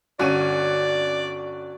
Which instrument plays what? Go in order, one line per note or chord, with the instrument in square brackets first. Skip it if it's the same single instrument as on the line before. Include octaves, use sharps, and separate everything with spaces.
[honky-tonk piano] G1 C#4 D#7 [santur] F#4 [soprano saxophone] D5